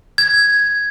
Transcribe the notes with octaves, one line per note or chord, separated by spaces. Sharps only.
G#6